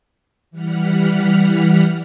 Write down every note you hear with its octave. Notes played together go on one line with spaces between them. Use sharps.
E3 G3 F#5 F6 B6